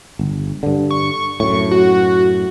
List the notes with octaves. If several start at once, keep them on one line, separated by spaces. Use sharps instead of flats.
G1
G2 D3
C#6
F#2 A2 C#6
F#4